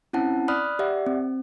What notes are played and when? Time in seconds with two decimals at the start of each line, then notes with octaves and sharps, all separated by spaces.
0.13 C4 C#4 E4 F#5 A5
0.48 D5 B5 D#6 F6 F#6
0.79 G4 D5 E5 F#5
1.06 C4